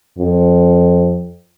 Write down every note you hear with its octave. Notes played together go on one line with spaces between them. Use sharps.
F2